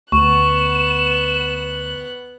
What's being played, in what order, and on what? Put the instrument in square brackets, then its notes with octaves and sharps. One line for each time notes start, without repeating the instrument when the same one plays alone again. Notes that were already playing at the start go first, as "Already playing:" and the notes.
[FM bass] D2 [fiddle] B3 F#6 [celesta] C#6 [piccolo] E7